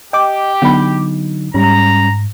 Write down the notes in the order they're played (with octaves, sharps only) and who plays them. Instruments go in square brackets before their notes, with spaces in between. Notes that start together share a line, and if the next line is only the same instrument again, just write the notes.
[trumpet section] G4 [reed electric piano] D#5 [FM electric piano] G5 D6
[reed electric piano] D3 F#3 D#4 [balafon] B3 B5
[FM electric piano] G#2 [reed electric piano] G3 C#4 [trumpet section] A#5